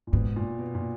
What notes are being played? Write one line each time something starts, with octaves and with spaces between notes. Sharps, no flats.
A#2
G#2 B2
A#2
B2
A#2